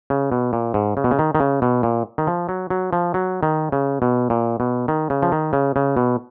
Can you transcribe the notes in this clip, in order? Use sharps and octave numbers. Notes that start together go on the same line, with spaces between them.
C#3
B2
A#2
G#2
C#3
B2
C#3
D#3
D#3
C#3
B2
A#2
D#3
F3
F#3
F#3
F3
F#3
D#3
C#3
B2
A#2
B2
D#3
C#3
F3
D#3
C#3
C#3
B2